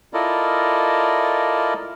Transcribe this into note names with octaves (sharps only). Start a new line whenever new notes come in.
E4 F4 A4 A#4 D5 D#5